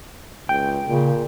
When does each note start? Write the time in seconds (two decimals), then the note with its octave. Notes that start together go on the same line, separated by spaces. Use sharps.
0.49 C#2 G5
0.88 A#2 C#3